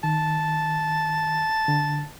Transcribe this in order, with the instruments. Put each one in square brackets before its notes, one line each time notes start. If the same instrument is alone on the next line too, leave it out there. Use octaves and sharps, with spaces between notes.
[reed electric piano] D#3 [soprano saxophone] A5
[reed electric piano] D3